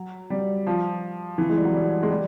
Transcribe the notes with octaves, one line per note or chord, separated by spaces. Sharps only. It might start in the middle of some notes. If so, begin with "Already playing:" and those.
Already playing: F#3
G3
F3
E3
G#3
G3
F#3
G3
G#3
G3